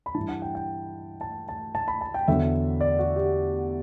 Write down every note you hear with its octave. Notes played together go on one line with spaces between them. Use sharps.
B5
E3 A5
G2
F#5
G5
G5
A5
A5
A5
B5
A5
G5
E2 D3 F#3 E5
D5
F#4
G4